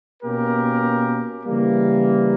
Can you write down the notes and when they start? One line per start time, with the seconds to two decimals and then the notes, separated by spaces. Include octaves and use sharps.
0.23 B2 A#3 C#4 G4 A#4
1.46 C#3 E3 G3 A#3